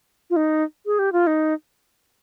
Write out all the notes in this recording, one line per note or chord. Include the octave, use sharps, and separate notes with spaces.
F4
D#4
G#4
G4
F4
D#4